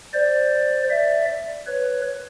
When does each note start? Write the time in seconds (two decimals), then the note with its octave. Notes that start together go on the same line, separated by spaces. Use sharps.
0.13 C5 D5
0.90 D5 E5
1.67 B4 C#5